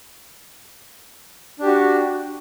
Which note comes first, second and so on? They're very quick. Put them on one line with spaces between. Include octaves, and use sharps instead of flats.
D4 G4 F#4